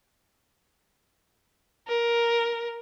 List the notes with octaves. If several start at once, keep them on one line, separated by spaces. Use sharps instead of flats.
A#4